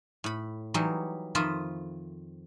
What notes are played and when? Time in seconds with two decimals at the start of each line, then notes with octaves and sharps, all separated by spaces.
0.24 A2 B5
0.74 E3 F#3 G3 D#4 G4
1.35 F2 D#3 F4 D#5 E5 B5